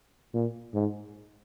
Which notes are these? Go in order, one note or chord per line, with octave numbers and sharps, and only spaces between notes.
A#2
G#2